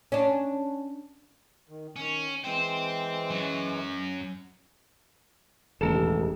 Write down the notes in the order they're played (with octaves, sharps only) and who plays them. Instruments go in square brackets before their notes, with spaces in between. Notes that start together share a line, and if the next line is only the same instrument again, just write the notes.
[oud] C#4 D4
[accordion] D#3
[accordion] D#3 [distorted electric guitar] C#4
[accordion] E3 G#3 [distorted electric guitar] C5 G5
[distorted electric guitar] F#2 F#3
[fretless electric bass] E1 [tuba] A1 [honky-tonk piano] D#2 G#3 E7 [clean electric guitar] A4 A5 A#5